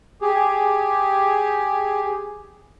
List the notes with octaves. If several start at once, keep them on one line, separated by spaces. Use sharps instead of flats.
G4 G#4